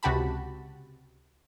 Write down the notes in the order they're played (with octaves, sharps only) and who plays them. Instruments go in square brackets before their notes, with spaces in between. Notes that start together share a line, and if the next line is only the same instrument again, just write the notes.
[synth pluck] C#2 C3 F#4 G4 A5 B5